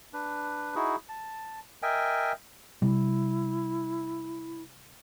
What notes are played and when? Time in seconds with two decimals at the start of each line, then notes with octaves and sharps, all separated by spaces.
0.13 D4 B4
0.75 D#4 E4 F#4 G#4
1.09 A5
1.82 A#4 D#5 E5 G5 G#5
2.82 C3 G3 E4